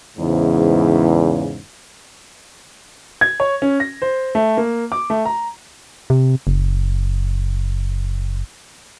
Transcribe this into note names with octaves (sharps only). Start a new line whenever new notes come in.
E2 G#2 C#3
G#6
C#5
C#4
A#6
C5
A3
A#3
D6
A3
A#5
C3
F#1